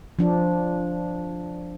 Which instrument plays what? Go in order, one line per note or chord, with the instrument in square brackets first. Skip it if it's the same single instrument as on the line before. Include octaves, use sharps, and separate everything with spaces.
[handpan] F3 D4